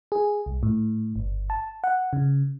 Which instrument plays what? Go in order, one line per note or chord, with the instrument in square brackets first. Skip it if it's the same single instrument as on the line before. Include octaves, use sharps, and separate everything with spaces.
[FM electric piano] G#4
C2
A2
G1
A5
F#5
C#3